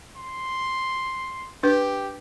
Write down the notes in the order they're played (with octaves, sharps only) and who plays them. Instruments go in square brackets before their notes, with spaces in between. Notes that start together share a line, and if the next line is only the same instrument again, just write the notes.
[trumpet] C6
[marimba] D4 B4 G6 [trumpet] G4